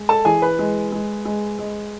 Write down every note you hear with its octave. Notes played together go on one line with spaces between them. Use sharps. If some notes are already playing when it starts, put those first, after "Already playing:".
Already playing: G#3
A4 A5
E3 G#4 G#5
B4 B5
G#3
G#3
G#3
G#3